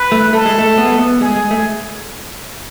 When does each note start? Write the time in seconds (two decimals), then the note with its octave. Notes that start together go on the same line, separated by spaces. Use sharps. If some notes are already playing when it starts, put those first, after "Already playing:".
Already playing: B4
0.12 A3
0.33 A3 A4
0.45 G#3
0.58 A3
0.78 B3
0.85 G#3
0.92 A3
0.99 B3
1.21 G#3 G#4
1.36 G#3
1.51 A3